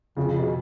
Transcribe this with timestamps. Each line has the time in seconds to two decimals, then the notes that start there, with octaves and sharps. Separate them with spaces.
0.17 F2 C#3
0.29 C#3
0.40 B2